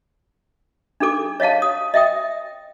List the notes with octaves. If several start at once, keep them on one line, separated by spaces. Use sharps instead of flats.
D4 D#4 G#4 A4 D6
C#5 D#5 F5 F#5 A5
D#6
D#5 E5 G5 D#6